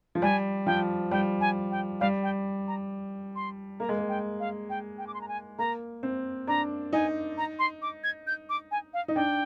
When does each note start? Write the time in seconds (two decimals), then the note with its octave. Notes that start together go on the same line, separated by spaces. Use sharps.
0.15 F3
0.22 G3 G#5
0.66 F3 G5
1.11 G3 G5
1.41 G#5
1.71 G5
2.00 G3 F5
2.23 G5
2.68 A#5
3.36 C6
3.80 A#3 A#5
3.89 G#3
3.98 A#3
4.09 G5
4.40 F5
4.70 G5
4.98 G5
5.07 D6
5.14 C6
5.21 A#5
5.28 G#5
5.59 A#3 A#5
6.03 C4
6.47 D4 A#5
6.93 D#4 G#5
7.38 A#5
7.59 C6
7.82 D6
8.04 G#6
8.27 G6
8.49 D6
8.71 G#5
8.94 F5
9.08 D#4
9.16 D4 G5